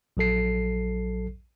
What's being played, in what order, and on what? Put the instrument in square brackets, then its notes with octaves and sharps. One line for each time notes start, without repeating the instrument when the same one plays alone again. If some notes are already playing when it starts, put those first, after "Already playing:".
[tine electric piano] A#1 F#3 A4 C7